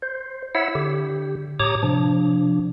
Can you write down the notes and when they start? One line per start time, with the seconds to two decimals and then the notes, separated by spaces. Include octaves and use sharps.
0.02 C5
0.55 E4 C#5 E5 F#5 E6
0.75 D3 G4
1.60 A2 G4 C#5 A#5 D6 D#6
1.83 C3 F3 D4